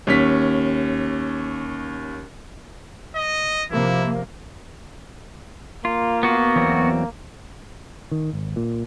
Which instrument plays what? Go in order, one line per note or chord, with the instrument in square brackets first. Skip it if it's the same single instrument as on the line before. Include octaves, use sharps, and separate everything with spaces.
[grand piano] D#2 C#4 B6
[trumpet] D#5
[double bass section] C3 F3 A#3 [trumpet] E4
[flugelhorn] A#3 [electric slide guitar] F4
[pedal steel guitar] B3 F#4
[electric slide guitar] E2 F#3 C4
[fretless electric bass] D#3
G#1
A#2